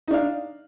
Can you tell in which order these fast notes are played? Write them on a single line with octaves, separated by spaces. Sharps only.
D#4 D4 F5